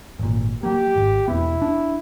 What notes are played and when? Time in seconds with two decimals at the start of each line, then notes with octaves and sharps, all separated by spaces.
0.19 G#1 A#2
0.63 F#3 A#3 G4
0.96 G#1
1.28 E1 B3 E4
1.62 D4